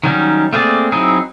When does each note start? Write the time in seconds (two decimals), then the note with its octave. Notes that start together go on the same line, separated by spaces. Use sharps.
0.03 D#3 F#3 G3 C#4 D#4
0.53 A3 A#3 C4 G#4 D5
0.92 F#3 C4 D#4 E4 G#4